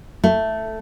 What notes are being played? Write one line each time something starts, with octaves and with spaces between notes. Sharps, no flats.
A3